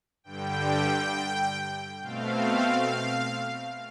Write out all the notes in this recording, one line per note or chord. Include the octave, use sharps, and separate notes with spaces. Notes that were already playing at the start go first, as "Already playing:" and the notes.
G2 D3 G3 G5
B2 A3 C4 F5